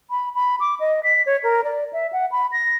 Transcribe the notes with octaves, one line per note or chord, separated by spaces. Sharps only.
B5
B5
D6
D#5
B6
C#5
A#4
D5
E5
F#5
B5
A#6